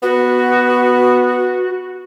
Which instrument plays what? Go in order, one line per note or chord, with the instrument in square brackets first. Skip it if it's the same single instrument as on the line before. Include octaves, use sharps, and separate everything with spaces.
[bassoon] B3 [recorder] F#4